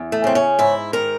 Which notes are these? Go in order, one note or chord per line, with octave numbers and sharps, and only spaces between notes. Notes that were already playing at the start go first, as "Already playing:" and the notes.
Already playing: E2
A3
C#3 C4
C#4
G#2 E4
D#3 A#4